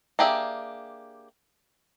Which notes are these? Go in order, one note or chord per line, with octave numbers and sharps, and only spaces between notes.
A#3 D4 G4 G#4 E5